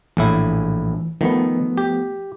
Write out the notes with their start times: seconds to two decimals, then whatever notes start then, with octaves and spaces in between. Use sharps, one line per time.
0.17 A#1 A2 E3 E4
1.21 D#3 F3 A3 B3
1.78 G4